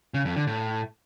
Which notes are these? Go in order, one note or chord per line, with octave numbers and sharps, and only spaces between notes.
C#3
F2
D3
A2